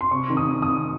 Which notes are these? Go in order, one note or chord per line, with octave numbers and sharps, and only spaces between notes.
C6
C3 C#6
D#3
D#6
D#3
D#6
D#3